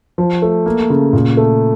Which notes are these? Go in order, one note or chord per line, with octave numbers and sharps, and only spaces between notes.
F3
A3
A#3
C#3
A#2
A3